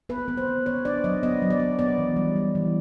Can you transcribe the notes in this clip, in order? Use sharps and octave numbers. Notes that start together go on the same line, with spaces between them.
B3 B4
B3
C5
B3
B3 C#5
D4 D5
F#3 D#5
B3 D#5
F#3
D5
B3
B3 D5
E3
G3
G3
E3